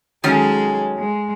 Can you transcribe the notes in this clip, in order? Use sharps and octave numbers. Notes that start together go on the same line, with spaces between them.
D#3 F#3 G#3 C#4 G#4 A4
G#3